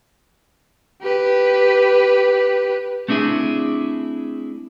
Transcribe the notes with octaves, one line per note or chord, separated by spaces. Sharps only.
G4 B4
A3 C4 D4 E4 G#4